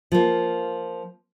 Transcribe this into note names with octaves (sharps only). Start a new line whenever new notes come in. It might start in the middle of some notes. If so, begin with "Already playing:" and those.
F3 A#3